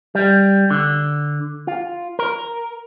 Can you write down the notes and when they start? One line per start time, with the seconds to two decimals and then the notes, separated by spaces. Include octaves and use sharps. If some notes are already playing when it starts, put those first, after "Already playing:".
0.15 G3
0.70 D3
1.67 F4
2.19 A#4